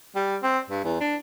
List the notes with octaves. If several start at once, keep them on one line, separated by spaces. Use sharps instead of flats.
G3
C4
G2
E2
D4